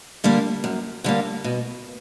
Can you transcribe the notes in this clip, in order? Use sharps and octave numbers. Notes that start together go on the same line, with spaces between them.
D3 G3 A#3
F#2
D3 G3 A#3
B2